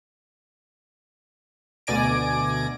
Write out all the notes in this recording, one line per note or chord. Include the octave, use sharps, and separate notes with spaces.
D2 B2 D5 G#5 A#6 D7